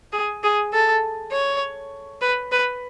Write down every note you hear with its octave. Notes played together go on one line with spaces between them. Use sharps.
G#4
G#4
A4
C#5
B4
B4